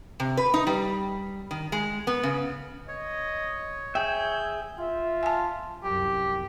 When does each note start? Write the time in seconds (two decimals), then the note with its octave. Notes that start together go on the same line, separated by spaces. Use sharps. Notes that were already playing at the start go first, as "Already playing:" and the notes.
0.20 C3
0.37 B4
0.54 D#4
0.67 G3
1.51 D#3
1.72 G#3
2.07 B3
2.23 C#3
2.88 C#5 D#5
3.95 G#4 E5 G5 G6
4.79 F4 E5
5.23 G#5 A5
5.84 C2 F#2 G4